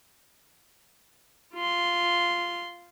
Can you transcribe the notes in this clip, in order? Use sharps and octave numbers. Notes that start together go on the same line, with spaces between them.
F4 C6